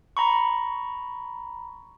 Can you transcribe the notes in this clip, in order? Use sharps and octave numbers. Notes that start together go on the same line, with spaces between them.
A#5 B5 C#6